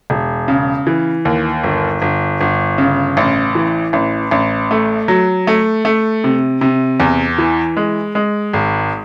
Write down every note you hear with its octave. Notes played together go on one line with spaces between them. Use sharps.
E1
C#3
E3
D#2
G1
G1
G1
C#3
A1
E3
A1
A1
A3
F#3
A3
A3
C3
C3
E2
E3
G#3
G#3
G#1